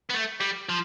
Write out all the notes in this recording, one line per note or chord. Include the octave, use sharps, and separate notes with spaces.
B3
A3
G3
F3